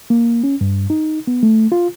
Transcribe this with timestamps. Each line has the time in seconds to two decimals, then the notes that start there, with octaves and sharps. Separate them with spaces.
0.10 A#3
0.44 C#4
0.61 G2
0.90 D#4
1.27 B3
1.43 A3
1.72 F4